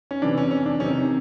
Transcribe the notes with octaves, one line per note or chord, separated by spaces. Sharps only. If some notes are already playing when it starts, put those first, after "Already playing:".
C#4
C3 E3 D4
C#4
C#4
D4
C3 D#3 C#4